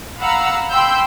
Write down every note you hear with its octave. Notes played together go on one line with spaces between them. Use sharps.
F5 F#5 A#5 B5 E6
G5 B5 C6 E6 G6